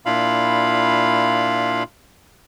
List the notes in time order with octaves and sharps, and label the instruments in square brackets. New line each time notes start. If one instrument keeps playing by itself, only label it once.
[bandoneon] A#2 D4 E4 F4 F5 B5